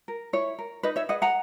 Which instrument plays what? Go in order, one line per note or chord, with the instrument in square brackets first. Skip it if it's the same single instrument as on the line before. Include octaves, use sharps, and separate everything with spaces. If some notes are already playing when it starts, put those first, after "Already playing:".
[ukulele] A#4
E4 C#5
A#4
D#4 B4 D#5
C#5 E5
G#4 B4 D#5 F#5
F#5 A#5